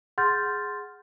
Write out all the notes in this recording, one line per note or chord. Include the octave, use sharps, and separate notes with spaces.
G#4 F#5 C6 F6 G6 A6